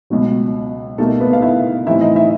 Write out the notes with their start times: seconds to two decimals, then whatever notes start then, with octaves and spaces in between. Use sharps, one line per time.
0.10 C#2 B2 F#3
0.98 B2 G3 A3 A#3 D#4 A4
1.20 B3 B4
1.33 F5
1.42 E4 E5
1.86 A2 E3 G3 C4 D#4 E4 E5
2.01 D#4 D#5
2.16 E4 E5